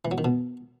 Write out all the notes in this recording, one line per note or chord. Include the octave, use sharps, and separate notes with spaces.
E3
F#3
D#3
B2